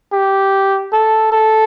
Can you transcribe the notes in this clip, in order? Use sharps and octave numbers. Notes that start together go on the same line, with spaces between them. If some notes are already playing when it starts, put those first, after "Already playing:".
G4
A4
A4